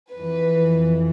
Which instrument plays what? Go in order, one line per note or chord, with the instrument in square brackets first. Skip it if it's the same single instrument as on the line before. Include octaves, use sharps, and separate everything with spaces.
[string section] F2 E3 B4